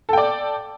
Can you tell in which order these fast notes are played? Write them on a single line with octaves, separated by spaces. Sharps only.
A4 G5 D5